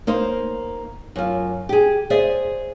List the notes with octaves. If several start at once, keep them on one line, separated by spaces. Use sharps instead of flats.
A#3 D#4 C5
F#2 F4
G4 G#4
G#4 C5 D5 E5